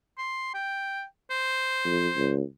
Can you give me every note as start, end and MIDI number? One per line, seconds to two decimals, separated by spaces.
0.18 0.52 84
0.54 1.04 79
1.30 2.33 72
1.86 2.08 41
2.17 2.42 37